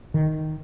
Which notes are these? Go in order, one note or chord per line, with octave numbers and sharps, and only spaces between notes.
D#3